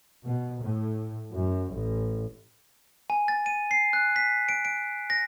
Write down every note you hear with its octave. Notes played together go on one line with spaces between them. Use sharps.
B2
A2
F#2
A1
G#5
A6
D#7
C7
F#6
B6
D7
D7
A#6